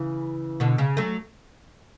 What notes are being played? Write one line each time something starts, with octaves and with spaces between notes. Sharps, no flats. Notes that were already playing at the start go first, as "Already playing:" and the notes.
Already playing: C#3 E3
B2 D3
C#3
F#3 A3